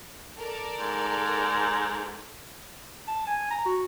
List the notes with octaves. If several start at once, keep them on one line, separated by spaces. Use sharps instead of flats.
A4 A#4 D5
G#2
A5
G#5
A#5
F#4